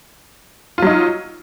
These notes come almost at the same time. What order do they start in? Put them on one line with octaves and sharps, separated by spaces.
F4 F#3 D#4